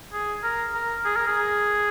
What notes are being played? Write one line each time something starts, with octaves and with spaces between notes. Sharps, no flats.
G#4
A#4
A#4
G#4
A#4
G#4